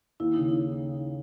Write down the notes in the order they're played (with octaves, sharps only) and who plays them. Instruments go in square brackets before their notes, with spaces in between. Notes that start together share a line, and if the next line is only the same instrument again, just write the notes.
[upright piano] D#2 [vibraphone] E4
[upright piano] C#3 [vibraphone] D#4
[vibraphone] D#4